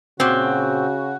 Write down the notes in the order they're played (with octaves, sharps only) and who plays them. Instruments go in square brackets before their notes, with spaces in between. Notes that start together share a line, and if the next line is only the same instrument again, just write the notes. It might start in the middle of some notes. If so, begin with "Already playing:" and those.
[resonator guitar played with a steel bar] A#2 C4 [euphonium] C#3 [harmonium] F#4